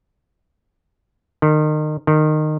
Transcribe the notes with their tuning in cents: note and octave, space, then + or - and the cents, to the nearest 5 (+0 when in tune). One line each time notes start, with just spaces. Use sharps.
D#3 -30
D#3 -20